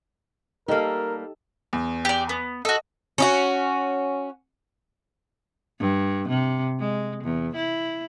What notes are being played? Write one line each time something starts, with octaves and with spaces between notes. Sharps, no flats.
G3 A#3 D#4 G4 A4 A#4 D#5
E2
G4 D5
B3
F#4 A4 D#5
C#4 D#4 F#4
G2
C3
G#3
E2
E4